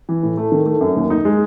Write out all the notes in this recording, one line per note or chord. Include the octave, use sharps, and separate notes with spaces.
E3
A2
A3
D#3
A3
F#2
D#2
D#4
G#3